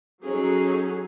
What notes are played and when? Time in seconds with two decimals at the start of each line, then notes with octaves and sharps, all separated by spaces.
0.24 F#3 C#4 D#4 G#4 A4